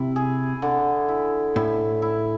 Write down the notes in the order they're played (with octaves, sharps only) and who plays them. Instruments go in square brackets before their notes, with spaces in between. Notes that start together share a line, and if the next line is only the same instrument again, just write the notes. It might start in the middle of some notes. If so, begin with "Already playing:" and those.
Already playing: [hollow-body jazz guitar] C3 [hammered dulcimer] E4
[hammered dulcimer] G#4
D3
E4
[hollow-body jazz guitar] A2 [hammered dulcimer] E4
[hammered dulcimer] E4